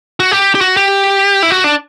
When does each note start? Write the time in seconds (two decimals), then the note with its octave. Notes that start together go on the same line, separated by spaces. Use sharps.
0.20 F#4
0.31 G4
0.55 G4
0.61 F#4
0.77 G4
1.43 E4
1.51 F#4
1.64 D4